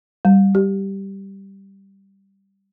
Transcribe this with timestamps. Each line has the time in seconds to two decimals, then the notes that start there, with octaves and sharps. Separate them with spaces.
0.25 G3
0.55 G4